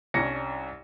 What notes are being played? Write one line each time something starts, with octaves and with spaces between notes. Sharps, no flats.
C2 C#4 D4 A#6 C#7